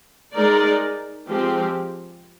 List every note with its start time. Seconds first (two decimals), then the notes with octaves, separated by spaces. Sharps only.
0.34 G#3 D#4 A#4 D5
1.27 F3 G#3 C4 G4